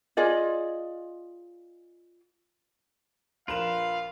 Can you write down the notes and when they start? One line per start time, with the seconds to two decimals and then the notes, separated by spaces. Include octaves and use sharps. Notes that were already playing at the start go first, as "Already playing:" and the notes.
0.17 F4 G#4 D5 D#5
3.48 A#1 F4 A#4 B4 F5 E7